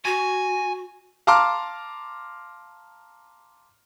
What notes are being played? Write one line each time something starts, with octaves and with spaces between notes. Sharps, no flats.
F#4 G#5
F5 A5 A#5 C6 D6 F6